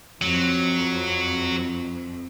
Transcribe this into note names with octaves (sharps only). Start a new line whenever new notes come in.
F2 F#3